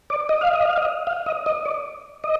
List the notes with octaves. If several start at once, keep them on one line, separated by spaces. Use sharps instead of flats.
D5
D#5
F5
D#5
F5
D#5
F5
D#5
D#5
D5
D#5